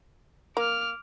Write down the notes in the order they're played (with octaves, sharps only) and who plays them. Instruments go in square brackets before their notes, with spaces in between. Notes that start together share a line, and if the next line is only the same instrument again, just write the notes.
[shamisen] A#3 [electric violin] D6 F6